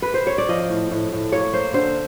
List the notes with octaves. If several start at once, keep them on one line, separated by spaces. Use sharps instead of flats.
B4
C5
C#5
D5
F3 D#5
A2
A2
A2
A#3 C#5
A#3 C5
D3 C5